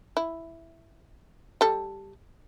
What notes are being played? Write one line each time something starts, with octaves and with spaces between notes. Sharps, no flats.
E4
G3 A4